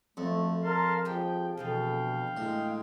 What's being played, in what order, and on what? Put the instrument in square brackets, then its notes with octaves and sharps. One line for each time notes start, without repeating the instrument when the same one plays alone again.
[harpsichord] F2 [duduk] A3 [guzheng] F#4 A4
[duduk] A#4 [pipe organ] F5 A5 C6
[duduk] F3 [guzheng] G#3 G4 [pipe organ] G5
[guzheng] E2 D3 B3 [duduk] B2 [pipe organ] F5 G5
[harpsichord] A2 [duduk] G#3